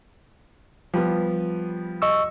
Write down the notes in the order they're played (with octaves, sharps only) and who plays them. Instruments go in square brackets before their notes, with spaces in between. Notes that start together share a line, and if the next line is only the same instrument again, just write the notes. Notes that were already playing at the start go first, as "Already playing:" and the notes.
[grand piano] F3 G3 B3
[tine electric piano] D#5 C#6 E6